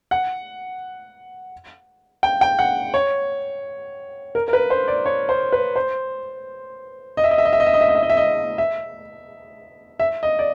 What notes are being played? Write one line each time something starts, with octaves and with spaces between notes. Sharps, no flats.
F#5
G5
G5
F#5
C#5
A#4
A#4
B4
C5
D5
C#5
C5
B4
C5
D#5
E5
D#5
E5
D#5
E5
D#5
E5
D#5
E5
D#5
E5
D#5
E5
D#5
E5
E5
D#5
D5